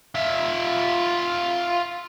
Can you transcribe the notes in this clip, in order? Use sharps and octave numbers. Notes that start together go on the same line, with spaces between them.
F4 E5